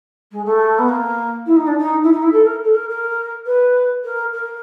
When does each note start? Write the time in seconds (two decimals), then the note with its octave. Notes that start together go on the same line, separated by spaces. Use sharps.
0.31 G#3
0.45 A3
0.78 B3
0.88 A#3
1.46 E4
1.56 D#4
1.67 D4
1.78 D#4
2.03 E4
2.12 D#4
2.22 E4
2.32 A4
2.46 A#4
2.63 A4
2.75 A#4
2.89 A#4
3.46 B4
4.04 A#4
4.33 A#4